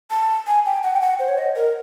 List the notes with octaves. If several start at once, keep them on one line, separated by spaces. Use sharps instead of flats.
A5
G#5
G5
F#5
G5
F#5
C5
C#5
D#5
A#4